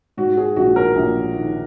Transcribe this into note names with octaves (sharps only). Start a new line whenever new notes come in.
G#2 F#4
G#4
A#1 F#4
A#4
A#1
D#3